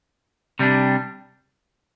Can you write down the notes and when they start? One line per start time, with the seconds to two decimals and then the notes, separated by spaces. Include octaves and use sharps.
0.59 C3 G3 D4